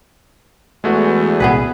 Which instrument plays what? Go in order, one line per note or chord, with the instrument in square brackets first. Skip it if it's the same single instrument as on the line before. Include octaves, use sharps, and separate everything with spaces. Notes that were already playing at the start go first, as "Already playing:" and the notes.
[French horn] E2 [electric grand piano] G#3 A3 F#4
[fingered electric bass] C2 A#2 [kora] B3 G#4 B4